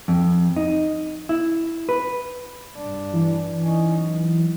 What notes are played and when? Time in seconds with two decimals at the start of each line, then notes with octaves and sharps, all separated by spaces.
0.08 F2
0.56 D#4
1.29 E4
1.89 B4
2.76 G2 D4
3.13 E3
3.62 C#4 D#4
4.01 F#3